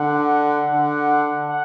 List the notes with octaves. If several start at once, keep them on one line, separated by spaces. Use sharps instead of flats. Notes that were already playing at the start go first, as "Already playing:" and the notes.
Already playing: D3 F#5
D3
F#5